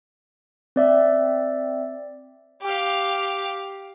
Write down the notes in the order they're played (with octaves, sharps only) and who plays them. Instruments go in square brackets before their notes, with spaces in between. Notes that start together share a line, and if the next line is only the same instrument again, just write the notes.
[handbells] C4 D5 E5
[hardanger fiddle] G4 F5